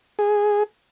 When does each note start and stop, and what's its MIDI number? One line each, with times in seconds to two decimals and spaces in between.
0.19 0.63 68